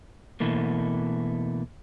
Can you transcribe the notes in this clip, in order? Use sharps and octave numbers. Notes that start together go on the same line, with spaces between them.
B2 E3 A3 A#3